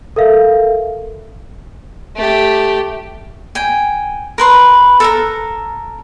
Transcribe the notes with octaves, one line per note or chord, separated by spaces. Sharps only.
A4 A#4 E5 F5
A3 G4
G5 G#5
A#4 B4 C6
A4 A#4 A#5